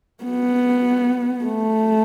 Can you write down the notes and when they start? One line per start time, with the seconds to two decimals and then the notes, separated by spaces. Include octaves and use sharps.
0.23 B3
1.45 A3